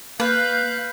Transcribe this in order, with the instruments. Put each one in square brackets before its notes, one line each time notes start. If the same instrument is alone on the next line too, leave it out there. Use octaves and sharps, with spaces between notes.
[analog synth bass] A#3 [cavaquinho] B4 [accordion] F5 F#6 [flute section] G6